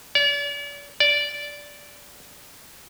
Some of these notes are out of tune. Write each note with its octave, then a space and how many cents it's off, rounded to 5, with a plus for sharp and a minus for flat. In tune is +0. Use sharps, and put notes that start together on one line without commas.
D5 -40
D5 -10